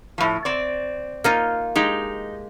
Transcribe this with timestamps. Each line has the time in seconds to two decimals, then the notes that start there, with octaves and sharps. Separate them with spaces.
0.18 A2 F3
0.45 C4 D5
1.24 A#3 D#4 F4
1.76 G#3 D#4 G4